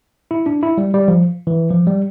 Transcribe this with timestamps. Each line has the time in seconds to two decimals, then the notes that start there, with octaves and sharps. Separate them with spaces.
0.31 E4
0.46 D4
0.63 E4
0.78 G3
0.94 G3
1.08 F3
1.47 E3
1.70 F3
1.87 G3